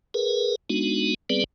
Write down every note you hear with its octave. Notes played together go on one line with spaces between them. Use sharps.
G#4 A#4 B4
G#3 B3 D4 D#4 F#4
G3 B3 C4 G#4 B4 D5